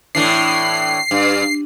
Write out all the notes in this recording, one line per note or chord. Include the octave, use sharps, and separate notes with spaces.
A2 E3 D4 C7
G2